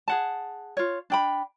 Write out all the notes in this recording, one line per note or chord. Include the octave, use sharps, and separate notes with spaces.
G#4 F#5 A5
F4 C#5
D4 G5 B5